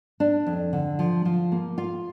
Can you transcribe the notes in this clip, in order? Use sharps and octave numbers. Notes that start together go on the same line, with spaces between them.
D4
F2
D3
F3
F3
A#3
F4